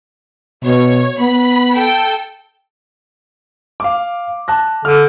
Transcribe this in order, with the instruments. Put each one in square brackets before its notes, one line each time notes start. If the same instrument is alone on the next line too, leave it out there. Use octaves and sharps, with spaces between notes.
[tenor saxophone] B2 [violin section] C#5
[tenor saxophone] B3 [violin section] B5
[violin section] A4 G5
[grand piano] F5 D6
A5 F#6 A#6
[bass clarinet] D3 [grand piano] F6